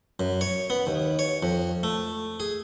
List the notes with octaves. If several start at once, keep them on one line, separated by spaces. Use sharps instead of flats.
F#2
C#5
B3
D#2
C#5
F2
A3
G#4